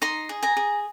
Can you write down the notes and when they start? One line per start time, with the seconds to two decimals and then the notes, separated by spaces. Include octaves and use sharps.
0.02 D#4 A#5 C6
0.29 G#4
0.43 G#5 A#5
0.57 G#4